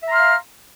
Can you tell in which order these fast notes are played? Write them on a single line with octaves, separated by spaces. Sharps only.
E5 A#5 C6 F6 F5